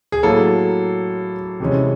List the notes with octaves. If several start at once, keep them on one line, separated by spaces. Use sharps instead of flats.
G#4
A2 F#3 A#3 A4
C3 E3 G#3 C#4